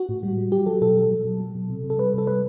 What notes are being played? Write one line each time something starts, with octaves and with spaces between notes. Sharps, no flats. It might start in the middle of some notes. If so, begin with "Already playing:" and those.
Already playing: F#4
A2
G3
G3
F#3 G4
F#3 A4
B2 A4
F#3
F#3
B2
F#3
B2
C3
C3
A4
G3 B4
C3 A4
G3 B4